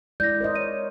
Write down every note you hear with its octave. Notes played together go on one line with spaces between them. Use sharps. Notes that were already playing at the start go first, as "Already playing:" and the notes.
G#3 E4 D5 G6 A#6
A#4 C5 D#5
C#5 D#7